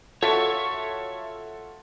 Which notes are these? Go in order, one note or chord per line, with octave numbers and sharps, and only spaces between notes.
F4 F#4 A4 C#5 E5 C#6